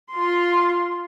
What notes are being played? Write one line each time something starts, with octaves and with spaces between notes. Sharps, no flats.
F4 C6